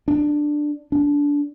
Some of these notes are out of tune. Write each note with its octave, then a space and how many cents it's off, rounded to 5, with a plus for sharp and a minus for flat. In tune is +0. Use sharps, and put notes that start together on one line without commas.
D4 +10
D4 -20